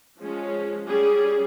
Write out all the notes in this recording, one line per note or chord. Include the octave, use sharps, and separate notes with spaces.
F3 G#3 C#4
G3 C#4 G#4